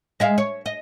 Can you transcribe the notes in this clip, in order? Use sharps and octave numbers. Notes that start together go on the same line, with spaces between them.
G#3 E5 F5
C#5
D#5